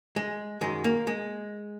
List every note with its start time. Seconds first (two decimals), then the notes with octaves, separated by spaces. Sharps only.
0.16 G#3
0.61 F#2 D#3 G#3
0.84 A#3
1.07 G#3